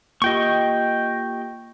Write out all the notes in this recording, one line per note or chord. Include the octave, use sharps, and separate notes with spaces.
A#3 F4 G4 D#5 G5 C#6